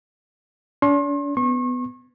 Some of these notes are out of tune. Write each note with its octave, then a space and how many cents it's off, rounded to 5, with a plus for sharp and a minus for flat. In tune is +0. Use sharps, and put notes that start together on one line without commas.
D4 -45 C6 +40
B3 +15 C#6 -40